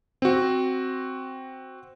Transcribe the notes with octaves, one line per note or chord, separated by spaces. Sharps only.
C4 F#4